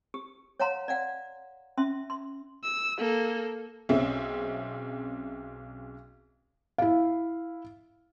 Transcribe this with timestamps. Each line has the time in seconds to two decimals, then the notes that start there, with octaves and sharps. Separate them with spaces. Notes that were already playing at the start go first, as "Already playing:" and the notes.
0.14 G4
0.60 C#5 F5 F#5 A#5 C6
0.88 D5 F5 F#5
1.78 C#4 E5 C6
2.10 C6
2.63 E6
2.98 A#3 A4
3.89 B1 C4 C#4 G#4 E5
6.78 E4 F5